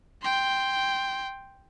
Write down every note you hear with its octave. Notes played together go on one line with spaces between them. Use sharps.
G5 C6